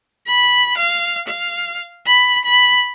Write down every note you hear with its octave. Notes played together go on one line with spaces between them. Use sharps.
B5
F5
F5
B5
B5